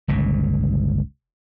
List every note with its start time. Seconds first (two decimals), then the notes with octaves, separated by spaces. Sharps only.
0.08 G1 C#2 A#2